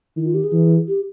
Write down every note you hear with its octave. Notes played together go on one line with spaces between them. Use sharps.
D#3 E4
F4
G4
G#4
E3
G4